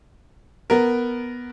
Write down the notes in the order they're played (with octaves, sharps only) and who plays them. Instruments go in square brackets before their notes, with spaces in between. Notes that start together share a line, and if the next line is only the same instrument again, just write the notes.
[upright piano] B3 A#4